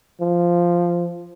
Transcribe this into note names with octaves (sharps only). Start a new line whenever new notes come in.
F3